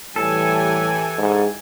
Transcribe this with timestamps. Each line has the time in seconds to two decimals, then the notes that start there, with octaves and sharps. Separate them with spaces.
0.16 A2 E3 G3 G4 A4 G#5
1.19 G#2 G#3